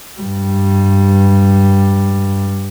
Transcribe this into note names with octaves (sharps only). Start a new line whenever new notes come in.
G2 G3